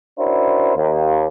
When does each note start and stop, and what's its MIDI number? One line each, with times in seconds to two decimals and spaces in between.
0.18 0.75 61
0.18 0.75 62
0.18 0.75 64
0.18 0.75 66
0.18 0.75 70
0.18 0.75 72
0.76 1.28 39